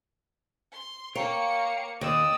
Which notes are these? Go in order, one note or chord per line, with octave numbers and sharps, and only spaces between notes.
C6
A#3 C#5 F5 G5 A#5 C#7
D#2 D5 D#5 G5 D#6 E6